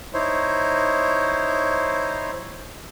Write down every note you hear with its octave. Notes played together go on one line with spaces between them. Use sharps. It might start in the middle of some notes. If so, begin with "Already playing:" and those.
D#4 E4 C5 C#5